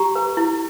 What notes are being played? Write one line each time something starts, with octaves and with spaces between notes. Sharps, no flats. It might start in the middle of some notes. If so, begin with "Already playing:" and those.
Already playing: G4 A#5 C#6
B4
E4